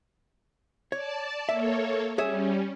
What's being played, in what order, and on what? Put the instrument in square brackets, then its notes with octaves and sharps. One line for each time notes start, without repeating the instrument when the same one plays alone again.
[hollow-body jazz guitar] C#5 [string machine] D5 A5
[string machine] A#3 A4 C#5 [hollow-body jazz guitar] E5
[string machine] G3 C#4 [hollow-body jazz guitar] G#4 C#5 E5